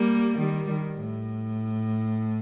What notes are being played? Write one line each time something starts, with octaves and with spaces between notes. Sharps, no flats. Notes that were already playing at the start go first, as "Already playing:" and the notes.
Already playing: G3 A#3
D#3 G3
D#3
A2